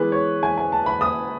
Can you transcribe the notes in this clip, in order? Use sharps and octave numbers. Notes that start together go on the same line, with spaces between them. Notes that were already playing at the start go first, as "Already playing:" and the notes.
Already playing: E3 G#3 B3 B4
C#5
G#5
G#5
A5
B5
D#6